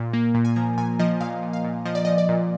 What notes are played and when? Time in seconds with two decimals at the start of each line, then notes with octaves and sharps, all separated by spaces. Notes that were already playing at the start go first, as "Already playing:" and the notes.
Already playing: A#2
0.13 A#3
0.35 A#2
0.45 G#5
0.56 F3 A#5
0.78 A#2 G#5
0.99 F3 D#5
1.21 A#2 F5
1.42 A#2
1.53 F5
1.64 A#2
1.85 F3 D#5
1.95 D5
2.05 F3 D#5
2.18 D5
2.29 A#2